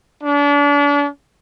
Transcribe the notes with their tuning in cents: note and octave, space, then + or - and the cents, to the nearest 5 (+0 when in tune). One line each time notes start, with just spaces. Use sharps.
D4 -35